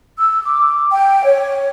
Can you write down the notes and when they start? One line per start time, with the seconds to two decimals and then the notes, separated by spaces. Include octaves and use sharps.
0.18 E6
0.43 D6
0.91 G5
1.24 C#5